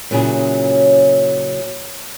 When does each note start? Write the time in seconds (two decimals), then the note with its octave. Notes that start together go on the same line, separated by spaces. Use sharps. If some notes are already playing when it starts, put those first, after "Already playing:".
0.11 A#2 C#3 F#3 C#4 E4 G#4